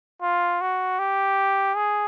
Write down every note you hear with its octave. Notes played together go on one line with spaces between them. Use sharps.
F4
F#4
G4
G#4